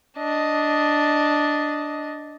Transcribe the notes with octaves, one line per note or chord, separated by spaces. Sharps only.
D4 D#5